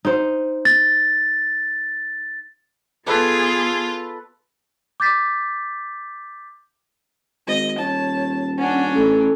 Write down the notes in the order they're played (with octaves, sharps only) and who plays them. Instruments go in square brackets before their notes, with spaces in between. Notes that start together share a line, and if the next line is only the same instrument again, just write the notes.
[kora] D#4 C5
[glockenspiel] A6
[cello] B3 G#4 [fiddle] F4 [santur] A4 B4 D5
[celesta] D6 G6 A6 B6
[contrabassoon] G#1 [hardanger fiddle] D#5
[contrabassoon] D#1 [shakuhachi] C#5 [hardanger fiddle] A5
[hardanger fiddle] C#4 D4 [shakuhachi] F#5
[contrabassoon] A1 [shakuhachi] A4